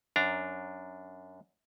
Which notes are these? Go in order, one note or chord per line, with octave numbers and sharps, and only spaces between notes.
F#2 D4 A#5